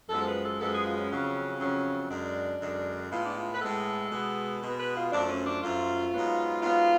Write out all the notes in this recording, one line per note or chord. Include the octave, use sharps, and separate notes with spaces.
F#2 F3 G#3 B3 A4
B4
A4
F#2 F3 G#3 B3 A4
G#4
F4
C#4
F2 C#3 F#3
F2 C#3 F#3
F#2 D3 G#3 D4
F#2 D3 G#3
A2 G#3 B3 F4
D4
F4
B4
A2 G#3 B3 A4
B2 G#3 B3
B2 G#3 B3 B4
B4
F4
F#2 F3 A3 D4
C#4
D4
F#2 F3 A3 F4
G#2 F#3 B3
G#2 F#3 B3 F4